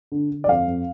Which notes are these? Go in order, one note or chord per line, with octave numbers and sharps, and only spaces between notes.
D3
D3
D5
F2 F5
F2